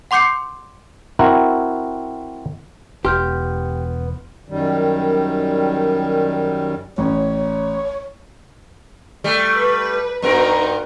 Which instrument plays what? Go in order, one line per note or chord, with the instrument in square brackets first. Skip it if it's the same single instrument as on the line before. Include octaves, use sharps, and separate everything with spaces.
[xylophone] F#5 C6 D6 G6 C7 C#7
[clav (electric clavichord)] C4 E4 F#4 A#4
[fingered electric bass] E1 [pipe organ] B3 [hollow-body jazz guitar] G4 [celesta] C6 F6 G6
[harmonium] F#2 D#3 G3
[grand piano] A1 C#4 [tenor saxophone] C#5
[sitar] G3 A3
[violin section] B4
[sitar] G2 B3 A#4 [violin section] D#4 F#4 A#5